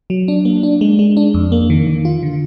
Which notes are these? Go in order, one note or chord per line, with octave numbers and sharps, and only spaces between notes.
F#3
D4
A#3
D4
G#3
G#3
D4
F2
A#3
D#3
D#3
F4
D3